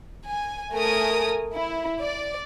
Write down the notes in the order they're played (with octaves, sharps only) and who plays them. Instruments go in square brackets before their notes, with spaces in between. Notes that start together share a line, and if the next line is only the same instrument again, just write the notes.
[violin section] G#5
A3 A#4 G#5 D#6
E4
D5